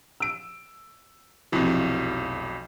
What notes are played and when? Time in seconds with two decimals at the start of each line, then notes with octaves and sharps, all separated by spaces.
0.20 E6 D7
1.52 F1 B1 F2 F3 E4 F#4